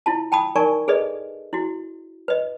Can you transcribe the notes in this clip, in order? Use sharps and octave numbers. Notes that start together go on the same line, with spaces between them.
E4 F4 A5
G5 A5 B5 D#6
D#4 A#4 D5 G#5 A5 C#6
G#4 A4 B4 D5 D#5
E4 F#4
B4 D#5